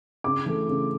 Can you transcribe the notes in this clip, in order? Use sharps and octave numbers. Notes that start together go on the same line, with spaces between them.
C#3 D6
E3 A3
C#3